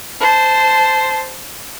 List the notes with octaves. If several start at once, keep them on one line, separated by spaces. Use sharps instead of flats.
C5 A5